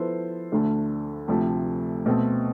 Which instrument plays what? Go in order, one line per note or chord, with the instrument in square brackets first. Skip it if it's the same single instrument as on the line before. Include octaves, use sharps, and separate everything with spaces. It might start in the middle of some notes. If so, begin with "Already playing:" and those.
Already playing: [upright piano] F3 B3 E4 A4 C5
D2 D3 A3
D2 C3 F3 A3
B2 A3 C4